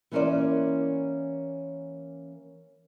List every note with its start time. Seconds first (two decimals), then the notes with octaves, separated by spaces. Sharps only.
0.11 E3 A#3 C#4 A#4 C5 D5